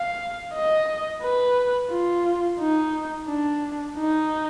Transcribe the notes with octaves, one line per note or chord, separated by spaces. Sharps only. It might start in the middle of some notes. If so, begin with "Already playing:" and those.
Already playing: F5
D#5
B4
F4
D#4
D4
D#4